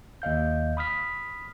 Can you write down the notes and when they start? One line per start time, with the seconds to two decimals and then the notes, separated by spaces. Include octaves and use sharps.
0.22 D#2 D#5 F5 G6
0.77 B5 D#6 F6 B6